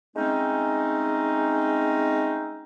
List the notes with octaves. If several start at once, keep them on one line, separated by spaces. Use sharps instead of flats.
G#3 A3 C4 C#4 D#4